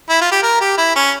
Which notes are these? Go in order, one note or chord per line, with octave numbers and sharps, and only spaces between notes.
E4
F4
G4
A#4
G4
E4
C#4